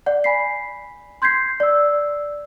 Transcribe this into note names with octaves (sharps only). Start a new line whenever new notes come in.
D5 F#5
G#5 B5 B6 C7
C6 G6 G#6 B6 C7
D5 E6